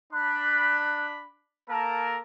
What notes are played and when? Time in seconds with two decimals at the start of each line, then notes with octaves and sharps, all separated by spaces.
0.13 D4 B5 F#6
1.69 A#3 A4 A#4 A5